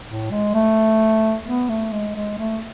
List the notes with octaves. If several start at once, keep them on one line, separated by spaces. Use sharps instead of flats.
A2
G#3
A3
B3
A3
G#3
G#3
A3